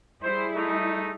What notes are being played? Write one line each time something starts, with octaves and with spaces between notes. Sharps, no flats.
G3 E4 G#4 C5
A3 D#4